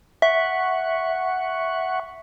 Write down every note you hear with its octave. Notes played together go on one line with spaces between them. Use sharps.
E5 F#5 C#6